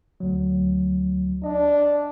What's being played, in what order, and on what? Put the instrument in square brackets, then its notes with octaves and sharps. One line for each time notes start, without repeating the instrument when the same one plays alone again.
[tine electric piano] D2 F#3
[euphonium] D4 [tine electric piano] D#5